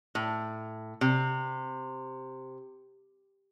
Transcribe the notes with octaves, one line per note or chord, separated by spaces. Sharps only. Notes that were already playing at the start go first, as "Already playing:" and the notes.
A2
C3